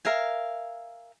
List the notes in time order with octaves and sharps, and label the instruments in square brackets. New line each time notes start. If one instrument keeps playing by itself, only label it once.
[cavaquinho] A#4 E5 F5 G#5